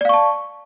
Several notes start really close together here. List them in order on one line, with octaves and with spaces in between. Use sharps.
D5 F5 C#6 A5